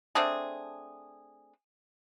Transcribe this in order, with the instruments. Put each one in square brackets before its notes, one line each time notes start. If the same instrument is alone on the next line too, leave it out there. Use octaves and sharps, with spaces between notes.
[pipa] A3 C4 D4 G#4